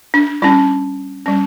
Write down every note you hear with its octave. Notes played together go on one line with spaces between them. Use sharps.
D4
G3 C#4 E4
G3 C#4